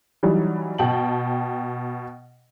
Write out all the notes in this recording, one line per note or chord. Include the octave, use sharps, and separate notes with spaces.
E3 F#3 G3 D#4
B2 G5 A5 F#7